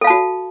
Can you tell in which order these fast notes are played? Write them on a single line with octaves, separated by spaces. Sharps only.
A4 F5 A5 F#4